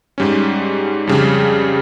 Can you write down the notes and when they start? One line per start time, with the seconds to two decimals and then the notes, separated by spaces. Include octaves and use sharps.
0.18 G#2 G3 C#4
1.07 F2 C#3 G3